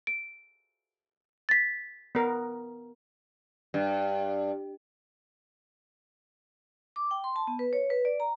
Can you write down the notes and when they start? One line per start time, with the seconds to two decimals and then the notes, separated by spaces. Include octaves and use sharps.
0.07 D7
1.49 A6 B6
2.15 B3 A#4
3.74 G2
6.96 D6
7.11 G5
7.24 C6
7.36 A5
7.47 B3
7.59 B4
7.73 C#5
7.90 B4
8.05 D5
8.20 A#5